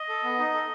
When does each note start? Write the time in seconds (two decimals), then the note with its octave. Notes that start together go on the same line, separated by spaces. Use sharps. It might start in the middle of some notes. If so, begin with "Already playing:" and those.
Already playing: D#5
0.09 A4
0.24 B3
0.39 D#4
0.54 A4